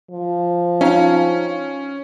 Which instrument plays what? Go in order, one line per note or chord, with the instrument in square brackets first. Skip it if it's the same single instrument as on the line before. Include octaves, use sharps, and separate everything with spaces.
[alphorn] F3
[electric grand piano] C#4 [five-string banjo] D#4 F5 G5